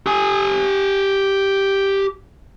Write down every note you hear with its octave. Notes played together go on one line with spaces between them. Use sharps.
G4 G#5